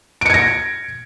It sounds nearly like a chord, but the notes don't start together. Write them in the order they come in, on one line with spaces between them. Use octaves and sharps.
D7 C#7 G#6 A#6